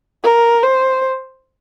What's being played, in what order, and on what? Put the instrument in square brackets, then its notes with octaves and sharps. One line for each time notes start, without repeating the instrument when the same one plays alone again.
[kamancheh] A#4
C5